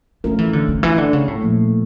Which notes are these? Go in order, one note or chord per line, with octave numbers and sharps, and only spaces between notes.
F3 A3 C#4 F4 A#4
E3
D3
D3
E3
D3
C#3
A2
A#2 F3 A#3